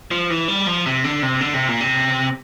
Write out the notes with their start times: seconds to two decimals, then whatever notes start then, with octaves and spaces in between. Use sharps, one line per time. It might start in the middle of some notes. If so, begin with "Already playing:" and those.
0.11 F3
0.30 E3
0.48 G3
0.67 F3
0.86 C3
1.04 D3
1.23 C3
1.41 D3
1.54 C3
1.68 A#2
1.81 C3